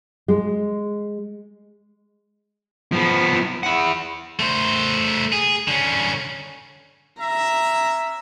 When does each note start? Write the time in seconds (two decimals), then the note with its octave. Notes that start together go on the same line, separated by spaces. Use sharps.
0.28 G#3
2.92 F3 B3
3.63 E4 F#5
4.40 A3 C5
5.33 G#4
5.68 D3 C#4
7.21 C#4 E5 A#5